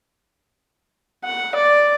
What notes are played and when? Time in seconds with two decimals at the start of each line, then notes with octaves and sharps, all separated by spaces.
1.24 F#5
1.55 D5